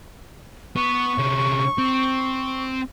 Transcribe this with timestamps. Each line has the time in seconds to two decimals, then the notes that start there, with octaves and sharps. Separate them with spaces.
0.76 B3 C#6
1.18 C3 C#4
1.78 C4